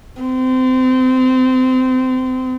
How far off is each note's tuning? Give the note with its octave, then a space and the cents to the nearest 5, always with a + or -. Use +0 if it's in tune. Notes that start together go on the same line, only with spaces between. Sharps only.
C4 -25